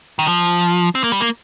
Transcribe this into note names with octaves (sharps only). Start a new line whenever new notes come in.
D#3
F3
C4
A#3
G3
A#3